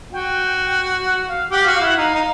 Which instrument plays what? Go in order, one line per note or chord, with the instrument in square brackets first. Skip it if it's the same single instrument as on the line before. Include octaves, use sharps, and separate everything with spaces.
[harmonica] F#4 [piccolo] G5
[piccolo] F#5
F5
[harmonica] G4 [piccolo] F#5
[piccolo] F5
[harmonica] F#4
[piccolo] F5
[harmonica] E4 [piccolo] F#5
[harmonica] D#4 [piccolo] F5
[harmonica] D#4